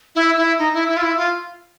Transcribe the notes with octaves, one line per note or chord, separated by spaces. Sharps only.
E4
E4
D#4
E4
E4
F4
E4
F4